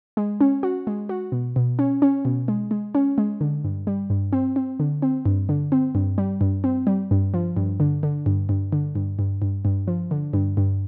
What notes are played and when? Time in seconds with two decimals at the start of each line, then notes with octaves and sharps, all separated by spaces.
0.17 G#3
0.41 C#4
0.63 F#4
0.87 G#3
1.09 F#4
1.32 B2
1.56 B2
1.79 C#4
2.02 C#4
2.25 B2
2.48 G#3
2.71 G#3
2.95 C#4
3.18 G#3
3.41 D3
3.64 G2
3.87 G3
4.10 G2
4.33 C4
4.56 C4
4.80 D3
5.02 C4
5.26 G2
5.49 D3
5.72 C4
5.95 G2
6.18 G3
6.41 G2
6.64 C4
6.87 G3
7.11 G2
7.34 F3
7.57 G2
7.80 D3
8.03 D3
8.26 G2
8.49 G2
8.73 D3
8.95 G2
9.19 G2
9.42 G2
9.65 G2
9.87 F3
10.11 D3
10.33 G2
10.57 G2